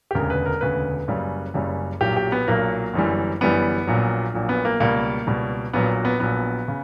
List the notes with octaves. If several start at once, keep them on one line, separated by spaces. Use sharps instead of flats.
G4
E1 D2 C#3 A#4
B4
A#4
E1 D2 C#3 B4
F#1 F#2 C#3 G3
F#1 F#2 C#3 G3
B1 A#2 F#3 G4
G4
B3
B1 A#2 F#3 A#3
G1 F#2 E3 G3
G1 F#2 E3 G3 B3
A#1 A#2 F#3
A#1 A#2 F#3
B3
A#3
C#2 B2 G3 A#3
C#2 B2 G3
A#1 A#2 F#3 B3
B3
A#1 A#2 F#3 B3
C#3